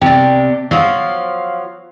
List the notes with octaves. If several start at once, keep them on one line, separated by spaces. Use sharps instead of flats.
C3 D4 G4
F3 F#3 F5